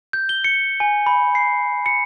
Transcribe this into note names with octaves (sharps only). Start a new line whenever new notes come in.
G6
G7
C#7
G#5
B5
C7
C#7